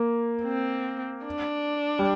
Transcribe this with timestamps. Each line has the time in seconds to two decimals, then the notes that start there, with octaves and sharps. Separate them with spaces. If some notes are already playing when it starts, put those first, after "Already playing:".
Already playing: A#3
0.44 C4
1.26 D4
1.99 G3